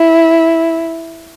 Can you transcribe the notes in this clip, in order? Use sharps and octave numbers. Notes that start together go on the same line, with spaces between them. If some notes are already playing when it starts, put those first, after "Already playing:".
Already playing: E4